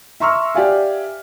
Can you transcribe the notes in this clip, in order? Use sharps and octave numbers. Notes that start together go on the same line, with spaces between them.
E5 A#5 C6 C#6 E6 F6
G4 D5 E5 F5 G#5